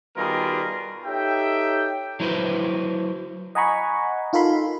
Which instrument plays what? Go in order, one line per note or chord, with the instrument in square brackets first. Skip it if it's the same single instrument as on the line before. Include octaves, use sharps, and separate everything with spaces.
[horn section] B2 D#3 G3 F4 G#4 A#4
[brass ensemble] D#4 G4 A4 C#5 E5 G5
[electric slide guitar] F#3 E4 B4 C5
[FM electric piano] D#5 F#5 G#5 A#5 B5 C#6
D#4 F4 A4 A#4 B5 C6